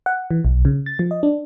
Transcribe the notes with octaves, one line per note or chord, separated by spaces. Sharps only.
F#5
E3
B1
C#3
A6
F3
D#5
D4